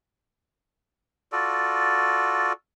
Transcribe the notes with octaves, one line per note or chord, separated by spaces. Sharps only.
F4 F#4 A4 D5